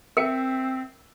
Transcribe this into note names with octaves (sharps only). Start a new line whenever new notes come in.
C4 A#4 E5 C#7